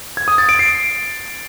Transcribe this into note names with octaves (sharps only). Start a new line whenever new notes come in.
G#6
D#6
A6
D7
C7